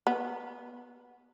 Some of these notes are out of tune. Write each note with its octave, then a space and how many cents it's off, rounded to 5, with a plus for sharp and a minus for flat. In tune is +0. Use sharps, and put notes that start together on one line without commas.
B3 -10